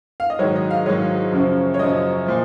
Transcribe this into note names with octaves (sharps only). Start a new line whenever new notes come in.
F5
D#5
G#2 D#3 F#3 C#5
D#5
F5
G#2 D#3 F#3 C#5
F#2 C#3 F3
C#5
F#2 C#3 F3 D#5
A#2 F3